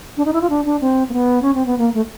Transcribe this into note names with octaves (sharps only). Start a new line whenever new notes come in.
D4
D#4
E4
F4
D4
D4
C4
A#3
B3
C#4
C4
B3
A#3
A3